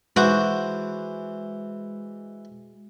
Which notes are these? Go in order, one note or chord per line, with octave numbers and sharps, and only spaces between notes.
E3 G#3 F#4 C5 D6